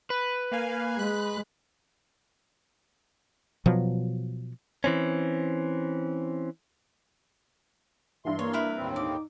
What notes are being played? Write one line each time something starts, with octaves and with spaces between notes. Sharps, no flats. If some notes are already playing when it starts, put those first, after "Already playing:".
B4
A#3 F5 G#5
G#3 B5 F#6
B2 F3 F#3
E3 C4 C#4
G2 E3 E5 C6
A#3 C#5
E4 A#4 B4
D#2 A2 C4
D#4 D6